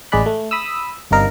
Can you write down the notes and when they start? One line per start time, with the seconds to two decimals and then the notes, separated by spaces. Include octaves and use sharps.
0.12 A1 G#3 G#4 D5 B5 F#6
0.26 A3
0.51 B5 D#6 E6
1.11 G1 C3 D4 D#4 A#4 F5